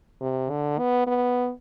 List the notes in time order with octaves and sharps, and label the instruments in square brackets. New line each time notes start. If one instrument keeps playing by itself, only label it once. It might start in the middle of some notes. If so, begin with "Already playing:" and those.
[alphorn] C3
D3
B3
B3